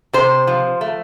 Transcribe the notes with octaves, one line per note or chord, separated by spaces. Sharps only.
C3 C5
F3
A3